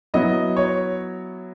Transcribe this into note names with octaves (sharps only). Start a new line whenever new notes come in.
F#3 B3 E4 D#5
C#5